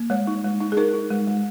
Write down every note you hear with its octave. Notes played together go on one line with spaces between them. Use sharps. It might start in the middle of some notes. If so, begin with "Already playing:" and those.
Already playing: A#3
G#3 C#5
D#4
G#3
D#4
G#4
D#4 A#4
D#4
G#3
G#3